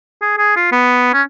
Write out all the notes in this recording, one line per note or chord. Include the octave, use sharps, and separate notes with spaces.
G#4
G#4
F4
B3
C#4